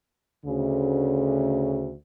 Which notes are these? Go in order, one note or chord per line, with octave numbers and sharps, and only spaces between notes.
D2 C#3